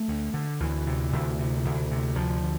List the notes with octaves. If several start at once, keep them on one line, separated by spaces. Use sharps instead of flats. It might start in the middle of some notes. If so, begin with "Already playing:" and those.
Already playing: A3
D2
D3
D2 E3
C3
D2
C3
D2
C3
D2 F3
D3